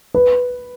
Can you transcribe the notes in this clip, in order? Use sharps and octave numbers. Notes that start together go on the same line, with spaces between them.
B4